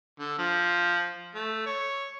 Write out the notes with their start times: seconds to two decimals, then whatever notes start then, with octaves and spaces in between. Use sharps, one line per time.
0.20 D3
0.38 F3
1.35 A3
1.66 C#5